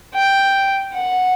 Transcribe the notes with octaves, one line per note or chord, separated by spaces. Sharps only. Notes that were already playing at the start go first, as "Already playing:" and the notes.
G5
F#5